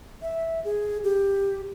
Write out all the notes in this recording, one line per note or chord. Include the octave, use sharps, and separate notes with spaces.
E5
G#4
G4